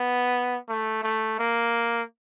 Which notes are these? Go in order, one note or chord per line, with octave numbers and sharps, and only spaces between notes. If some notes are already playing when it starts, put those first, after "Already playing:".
Already playing: B3
A3
A3
A#3